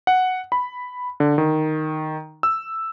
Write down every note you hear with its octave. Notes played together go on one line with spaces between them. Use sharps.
F#5
B5
D3
D#3
E6